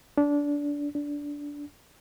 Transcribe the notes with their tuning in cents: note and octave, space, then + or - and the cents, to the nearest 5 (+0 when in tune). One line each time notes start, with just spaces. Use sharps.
D4 -20
D4 -15